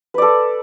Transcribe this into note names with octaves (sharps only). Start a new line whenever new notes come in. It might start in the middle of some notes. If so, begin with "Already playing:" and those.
A4 B4 D5